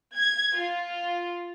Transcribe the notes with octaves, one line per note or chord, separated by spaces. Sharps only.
G#6
F4